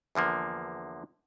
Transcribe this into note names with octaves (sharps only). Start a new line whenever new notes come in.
E2 D3 F3 A#3